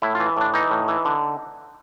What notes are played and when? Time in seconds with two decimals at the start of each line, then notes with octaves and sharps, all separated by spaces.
0.02 A2 E4
0.15 F4
0.20 E3
0.37 A2 D4
0.54 E3 D#4
0.71 A2
0.88 E3
1.05 D3